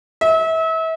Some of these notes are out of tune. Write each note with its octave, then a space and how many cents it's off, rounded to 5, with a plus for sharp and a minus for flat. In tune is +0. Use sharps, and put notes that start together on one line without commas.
E5 -35